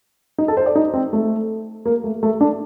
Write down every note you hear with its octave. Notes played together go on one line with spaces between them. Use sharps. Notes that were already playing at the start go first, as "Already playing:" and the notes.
D#4
A4
C5
D5
D#4
C4
A3
A#3
A3
A3
D4